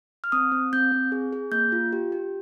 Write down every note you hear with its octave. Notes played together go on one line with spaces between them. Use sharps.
F6
C4 D#6
C4
C4 G6
C4
G#4
G#4
A#3 G6
F4
G4
G4